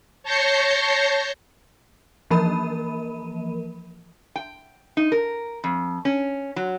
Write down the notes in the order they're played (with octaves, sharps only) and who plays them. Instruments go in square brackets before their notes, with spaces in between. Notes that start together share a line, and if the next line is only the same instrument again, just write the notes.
[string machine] C#5 A5 G6 A#6 C7 C#7
[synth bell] E3 F3 A#3 A#4 B5 D#7
[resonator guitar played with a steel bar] G5
D#4
A#4
F2
C#4
F#3